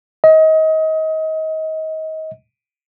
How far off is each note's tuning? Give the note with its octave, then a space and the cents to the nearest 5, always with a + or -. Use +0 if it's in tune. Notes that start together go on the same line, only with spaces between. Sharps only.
D#5 +30